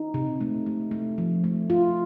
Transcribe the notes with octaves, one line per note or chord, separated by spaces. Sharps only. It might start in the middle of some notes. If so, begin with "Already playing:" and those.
Already playing: D#4
C3
A3
A3
A3
F3
A3
F4